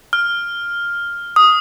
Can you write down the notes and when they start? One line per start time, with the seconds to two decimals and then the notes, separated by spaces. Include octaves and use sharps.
0.13 F6
1.36 D#6